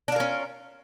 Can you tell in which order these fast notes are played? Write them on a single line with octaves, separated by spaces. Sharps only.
D4 F4 A#4 C#4